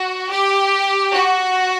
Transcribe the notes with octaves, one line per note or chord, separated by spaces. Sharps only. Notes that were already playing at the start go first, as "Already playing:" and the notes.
Already playing: F#4
G4
F#4